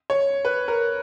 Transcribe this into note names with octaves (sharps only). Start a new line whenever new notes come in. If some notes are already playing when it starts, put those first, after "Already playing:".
C#5
B4
A#4